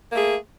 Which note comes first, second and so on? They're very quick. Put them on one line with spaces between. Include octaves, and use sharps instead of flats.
A#3 A3 G#4